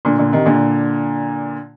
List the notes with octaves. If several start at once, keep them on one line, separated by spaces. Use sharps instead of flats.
A#2 D3
A#2 D3
C3 D#3
A#2 D3